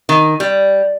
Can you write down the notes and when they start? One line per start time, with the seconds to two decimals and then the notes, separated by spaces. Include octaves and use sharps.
0.09 D#3
0.40 G3